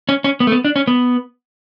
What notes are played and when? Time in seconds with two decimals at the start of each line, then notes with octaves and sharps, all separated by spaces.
0.09 C#4
0.24 C#4
0.40 B3
0.47 A3
0.52 B3
0.65 D4
0.76 C#4
0.88 B3